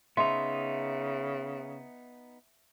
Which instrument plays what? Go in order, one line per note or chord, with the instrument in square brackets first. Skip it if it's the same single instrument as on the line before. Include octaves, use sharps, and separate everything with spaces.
[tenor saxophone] C#3 [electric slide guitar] B3 D#4 [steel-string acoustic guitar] E5 [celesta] C6